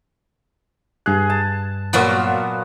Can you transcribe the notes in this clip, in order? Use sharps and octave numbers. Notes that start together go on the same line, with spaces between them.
G2 G#4 F#6
A5
A#2 F#3 B3 F4 F#4 D5